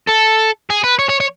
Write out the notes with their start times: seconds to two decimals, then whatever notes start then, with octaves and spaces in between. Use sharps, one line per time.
0.09 A4
0.70 G#4
0.84 B4
0.99 C#5
1.09 C#5
1.20 C#5